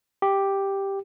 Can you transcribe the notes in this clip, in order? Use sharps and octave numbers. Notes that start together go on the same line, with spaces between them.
G4